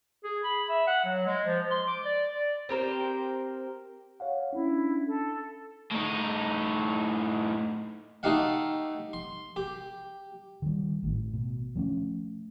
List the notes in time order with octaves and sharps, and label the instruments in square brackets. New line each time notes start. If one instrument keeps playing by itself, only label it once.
[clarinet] G#4
B5
E5
F#5
F#3
G#3
F3
C6
D6
D5
D5
[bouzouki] C4 G4 A#4 C5
[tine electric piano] C#5 F5 F#5
[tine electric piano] C#4 D4 [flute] E4
[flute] A4
[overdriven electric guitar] A2 D#4
[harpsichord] A3 D#4 G4 F5 F#5
C6
G4
[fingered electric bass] D#3 G3
G#1 A2
B2
F3 A3 C#4